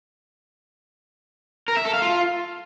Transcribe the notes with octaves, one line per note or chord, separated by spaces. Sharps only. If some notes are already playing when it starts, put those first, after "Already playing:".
A#4
E5
A4
F5
F4